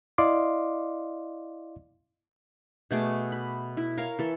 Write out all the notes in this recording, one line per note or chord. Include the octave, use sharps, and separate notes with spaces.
E4 D5 D#5 F5 C6 D6
B2 A3 G#4 D6
B5
E4
A#4 C#5 F5
E3 A4